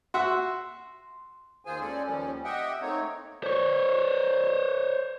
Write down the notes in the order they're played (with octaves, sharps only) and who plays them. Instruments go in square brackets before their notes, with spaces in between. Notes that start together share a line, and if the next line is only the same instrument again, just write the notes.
[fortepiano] F#4 E5 F#5 [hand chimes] C6
[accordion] D#2 D#3 F4 G#4 C5 G#5
G#3 C#4 A4 D5 G#5
D#2 D#3 F3 G3 C#4
G4 D#5 E5 F#5 G5
A3 A#3 C4 D#4 C#5
[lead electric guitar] C5 C#5